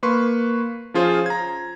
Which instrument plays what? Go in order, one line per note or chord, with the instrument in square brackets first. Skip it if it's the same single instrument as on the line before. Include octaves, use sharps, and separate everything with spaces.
[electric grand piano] A#3 B4 C6 C#6
F3 C#4 F4 G#4 C5
A#5 G#6